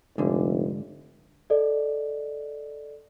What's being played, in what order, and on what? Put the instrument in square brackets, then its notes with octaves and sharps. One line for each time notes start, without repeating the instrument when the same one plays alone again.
[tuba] F1 [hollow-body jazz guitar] G#2 D3
[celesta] A4 D5 D#5